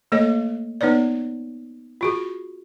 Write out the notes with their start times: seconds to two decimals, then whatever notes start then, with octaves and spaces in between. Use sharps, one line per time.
0.12 A3 A#3 A4 C#5 D#5
0.81 B3 D#4 B4 C#5 D5
2.01 F4 F#4 G#4